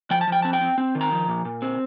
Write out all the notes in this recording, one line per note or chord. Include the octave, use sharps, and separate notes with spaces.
F3 G5
A5
F3
G5
C4 A5
G5
C4
C4
D#3
A#5
F3
A#2
A#2
C4